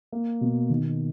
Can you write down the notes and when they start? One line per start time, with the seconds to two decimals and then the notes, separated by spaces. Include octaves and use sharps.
0.12 A#3
0.41 B2
0.70 D#3